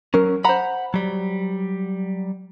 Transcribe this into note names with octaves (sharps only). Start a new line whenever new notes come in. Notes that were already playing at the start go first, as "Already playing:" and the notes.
F#3 C#4 A#4
C5 F#5 A#5 B5
F#3 G3